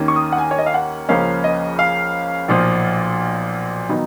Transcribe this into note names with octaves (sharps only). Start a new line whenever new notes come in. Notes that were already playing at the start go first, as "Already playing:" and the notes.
Already playing: D#2 D#3 A#3 C#4
C#6
D#6
F#5
G#5
C#5
D#5
F5
F#5
C#2 C#3 F3 A#3 C#4 F5
D#5
F5
B1 A#2 F3
D#3 F#3 B3 D#4